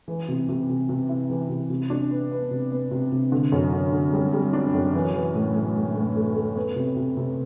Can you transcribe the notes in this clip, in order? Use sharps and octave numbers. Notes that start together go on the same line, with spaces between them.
E3
C3
C3
C3
C3
E4
E3
C3
C3
D4
B3
B3
C3
B3
C3
C3
D3
F#2
D3
D3
G3
G3
D4
F#2
E3
E3
A2
A2
A2
A2
A3
A3
B3
C3
C3
C3